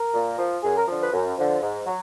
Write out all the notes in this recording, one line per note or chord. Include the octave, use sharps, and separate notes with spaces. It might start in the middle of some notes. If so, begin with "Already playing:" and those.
Already playing: A#4
A#2
F3
F#2 G#4
A#4
D3 F3
B4
F#2
D3 F3
G#2
F#3